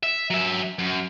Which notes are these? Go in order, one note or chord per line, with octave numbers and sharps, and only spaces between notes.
E5
F#3 E5
F#2